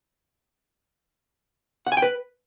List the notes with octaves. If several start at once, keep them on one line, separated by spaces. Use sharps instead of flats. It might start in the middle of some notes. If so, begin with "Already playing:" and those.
F#5
G#5
G5
B4